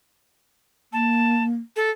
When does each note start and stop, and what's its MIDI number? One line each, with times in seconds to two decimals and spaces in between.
0.93 1.56 58
0.93 1.44 81
1.76 1.90 69